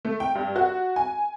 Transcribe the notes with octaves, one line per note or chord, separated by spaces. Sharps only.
A3
G5
G2
F#4
G#5